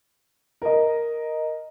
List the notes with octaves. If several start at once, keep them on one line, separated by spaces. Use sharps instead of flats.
A#4 D#5